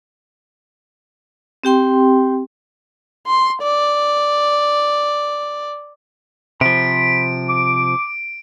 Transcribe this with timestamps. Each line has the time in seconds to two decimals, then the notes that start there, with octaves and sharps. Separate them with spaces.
1.64 C4 G4 G5 C6
3.27 C6
3.62 D5
6.61 C3 F3 B5 D7
7.49 D6